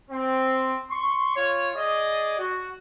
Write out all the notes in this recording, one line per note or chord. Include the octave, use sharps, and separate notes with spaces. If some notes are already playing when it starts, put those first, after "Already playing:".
C4
C6 C#6
F4 C#5
G#4 D5 D#5
F#4